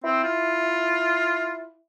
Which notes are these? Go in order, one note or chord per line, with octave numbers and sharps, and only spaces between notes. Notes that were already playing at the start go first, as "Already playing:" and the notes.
C4 E4
F4